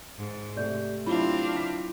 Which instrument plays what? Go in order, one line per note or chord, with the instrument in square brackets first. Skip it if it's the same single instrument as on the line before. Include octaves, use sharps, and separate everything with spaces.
[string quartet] G#2
[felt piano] C3 A3 [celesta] G4 D5 G6
[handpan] F#3 E4 F4 [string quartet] C4 D4 F5 [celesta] B5
[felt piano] D6 B6